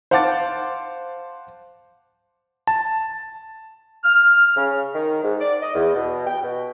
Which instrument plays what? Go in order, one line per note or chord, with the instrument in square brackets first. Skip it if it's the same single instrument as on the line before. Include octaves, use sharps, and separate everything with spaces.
[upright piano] C5 F5 F#5 A5 D6 A6
[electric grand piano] A5
[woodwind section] F6
C#3
D#3
G#2
D5
D#5
E2
B2
G5
B2